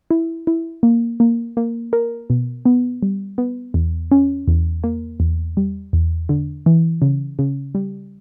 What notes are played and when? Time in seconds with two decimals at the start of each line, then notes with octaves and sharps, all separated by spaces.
0.11 E4
0.47 E4
0.83 A#3
1.20 A#3
1.57 A#3
1.93 A#4
2.30 B2
2.65 B3
3.03 G3
3.38 B3
3.74 E2
4.12 C#4
4.48 E2
4.84 A#3
5.20 E2
5.57 G3
5.93 E2
6.29 D3
6.66 E3
7.02 C#3
7.39 C#3
7.75 G3